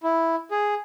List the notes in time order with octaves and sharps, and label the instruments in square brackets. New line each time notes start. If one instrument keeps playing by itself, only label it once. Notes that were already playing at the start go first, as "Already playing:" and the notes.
[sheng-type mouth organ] E4
G#4